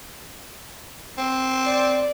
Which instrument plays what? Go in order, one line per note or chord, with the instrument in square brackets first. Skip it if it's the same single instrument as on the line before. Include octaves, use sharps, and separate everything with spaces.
[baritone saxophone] C4
[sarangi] D5